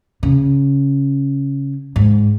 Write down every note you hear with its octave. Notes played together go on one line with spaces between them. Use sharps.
C#3
G#2